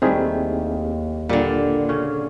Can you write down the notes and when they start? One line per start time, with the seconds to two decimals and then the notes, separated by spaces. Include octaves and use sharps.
0.02 D#2 D#3 G3 A3 C4 E4 G#4
1.29 A#2 D3 G3 A#3 F4 A#4
1.89 C#3 C#4